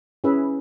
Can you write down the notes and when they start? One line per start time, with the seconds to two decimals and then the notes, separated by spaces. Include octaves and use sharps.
0.24 C#4 E4 G#4 B4 E5